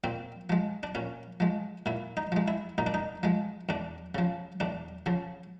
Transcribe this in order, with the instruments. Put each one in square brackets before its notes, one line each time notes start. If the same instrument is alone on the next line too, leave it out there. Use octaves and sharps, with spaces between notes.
[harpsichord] A#2 C4
F3 G#3
D4
A#2 C#4
F3 G#3
A#2 E4
D#4
F3 G#3
E4
A#2 D#4
D4
D#4
F3 G#3
E2 D4
C#3 F3
E2 D4
C#3 F3